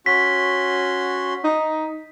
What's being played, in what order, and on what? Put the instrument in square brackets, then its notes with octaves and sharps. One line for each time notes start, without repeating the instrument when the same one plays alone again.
[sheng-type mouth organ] C#4 F#4 C6 [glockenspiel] B6
[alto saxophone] D#4